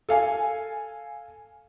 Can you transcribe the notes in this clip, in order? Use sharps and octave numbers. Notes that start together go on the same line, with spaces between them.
A4 F5 G#5